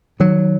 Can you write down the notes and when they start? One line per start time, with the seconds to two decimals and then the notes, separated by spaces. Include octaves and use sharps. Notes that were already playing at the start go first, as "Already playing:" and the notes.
0.20 D#3 F#3